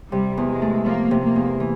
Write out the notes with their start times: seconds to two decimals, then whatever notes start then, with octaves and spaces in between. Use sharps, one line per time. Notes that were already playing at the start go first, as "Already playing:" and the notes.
0.12 C3 G3
0.37 E2
0.49 G#3
0.62 A3
0.86 F3 A#3
1.11 C3
1.23 A#3
1.36 E2
1.60 E3